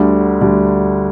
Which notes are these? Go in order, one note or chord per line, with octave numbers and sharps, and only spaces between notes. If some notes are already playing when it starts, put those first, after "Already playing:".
Already playing: D2 D3 G3
D2 D3 G3